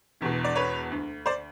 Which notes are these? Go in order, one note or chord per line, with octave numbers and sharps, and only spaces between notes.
E1 E2 B2
D5
B4 C#5
D2 D3
C5 D5